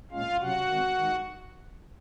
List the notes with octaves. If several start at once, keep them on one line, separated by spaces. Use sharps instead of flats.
A#2 G#3 C#4 F4 F5
C3 F#3 C#4 F#4 F#5
D#3 G#3 C4
D#3 G#3 D#4